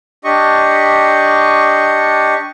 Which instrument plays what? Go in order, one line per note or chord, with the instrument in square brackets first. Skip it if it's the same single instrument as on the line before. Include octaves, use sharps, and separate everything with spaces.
[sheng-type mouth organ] D4 G4 D#5 C#6